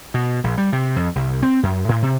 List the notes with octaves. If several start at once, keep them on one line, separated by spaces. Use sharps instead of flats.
B2
A#1
G3
C3
F2
C2
C4
F#2
A2
C3